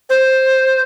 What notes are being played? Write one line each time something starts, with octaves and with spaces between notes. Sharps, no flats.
C5